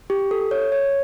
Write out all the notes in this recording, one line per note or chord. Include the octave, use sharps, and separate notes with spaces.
G4
A4
C#5
C#5